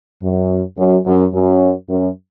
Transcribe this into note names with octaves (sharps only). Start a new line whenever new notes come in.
F#2
F#2
F#2
F#2
F#2